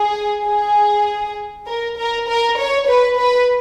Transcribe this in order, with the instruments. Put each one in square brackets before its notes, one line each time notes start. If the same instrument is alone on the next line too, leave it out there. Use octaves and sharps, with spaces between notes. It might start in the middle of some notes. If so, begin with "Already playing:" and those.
Already playing: [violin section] G#4
G#4
A#4
A#4
A#4
C#5
B4
B4